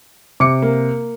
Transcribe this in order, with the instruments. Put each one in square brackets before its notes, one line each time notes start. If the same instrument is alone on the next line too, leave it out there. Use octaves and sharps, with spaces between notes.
[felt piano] C3 [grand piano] D6 C#7
[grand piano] A#3